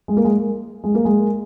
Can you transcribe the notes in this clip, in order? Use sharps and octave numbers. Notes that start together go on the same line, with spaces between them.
G#3
A#3
G#3
G#3
A#3
G#3